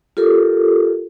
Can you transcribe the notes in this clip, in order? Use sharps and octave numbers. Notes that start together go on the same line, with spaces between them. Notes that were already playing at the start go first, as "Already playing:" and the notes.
F4 G4 A4 A#4